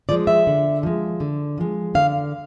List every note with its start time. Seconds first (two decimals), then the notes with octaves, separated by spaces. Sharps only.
0.09 F3 G#3 D5
0.27 E5
0.47 D3
0.83 F3 G#3
1.20 D3
1.58 F3 G#3
1.95 D3 F5